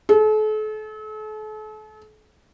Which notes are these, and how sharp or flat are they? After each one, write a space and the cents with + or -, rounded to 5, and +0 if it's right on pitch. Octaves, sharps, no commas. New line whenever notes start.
A4 -40